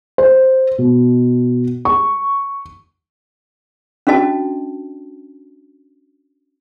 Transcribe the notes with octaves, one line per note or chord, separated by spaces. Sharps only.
C5
B2
C#6
C#4 D4 F#4 D#5 A5